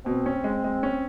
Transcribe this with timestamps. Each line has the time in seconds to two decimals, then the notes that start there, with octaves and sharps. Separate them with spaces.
0.05 B2 C4
0.26 C#4
0.44 G#3
0.64 G#3
0.83 C#4